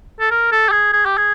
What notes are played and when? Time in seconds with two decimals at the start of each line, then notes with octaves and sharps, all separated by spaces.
0.20 A4
0.31 A#4
0.52 A4
0.69 G4
0.72 G#4
0.93 G#4
1.06 G4
1.18 G#4